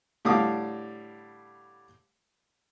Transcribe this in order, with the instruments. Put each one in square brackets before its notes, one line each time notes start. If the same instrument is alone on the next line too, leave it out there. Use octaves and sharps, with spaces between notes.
[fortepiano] A2 D3 G3 F5 D6 D#6